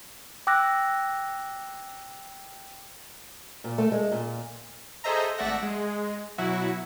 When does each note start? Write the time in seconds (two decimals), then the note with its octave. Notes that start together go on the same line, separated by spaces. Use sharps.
0.47 G5 D6 E6 F#6 A#6
3.64 A#2
3.78 A3
3.92 G#3
4.12 A#2
5.04 G#4 A4 C5 D#5 E5 A#5
5.38 G#1 A3 D5 E5 F#5 A#6
5.63 G#3
6.38 B2 F#3 E4 F#4